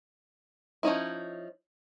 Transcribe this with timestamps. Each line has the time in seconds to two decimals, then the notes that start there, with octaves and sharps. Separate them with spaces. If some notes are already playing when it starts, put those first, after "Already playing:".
0.83 F3 C#4 D#4 E4